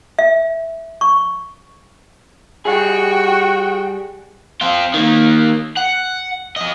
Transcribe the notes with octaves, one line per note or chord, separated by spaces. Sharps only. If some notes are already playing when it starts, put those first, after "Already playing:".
E5
C#6
G3 F#4 G#4 G5
C4 F4
D#3 A#3
F#5
F3 D#5